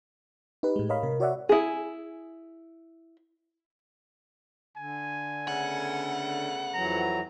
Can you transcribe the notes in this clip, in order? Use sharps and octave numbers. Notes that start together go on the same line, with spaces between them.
D#4 G4 B4
A2 G#3
A#4 C#5 D#5 F5 B5
C3 A#4
F#4 C#5 D5 E5 F#5
E4 G#4
D3 G#5
C#3 A3 B3 F#5
F2 E3 F#3 A#5